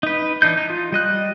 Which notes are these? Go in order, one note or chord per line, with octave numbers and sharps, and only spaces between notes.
D#4 B4
E3 D4 D#4 G6
D#4
F4
G3 D#5 F#6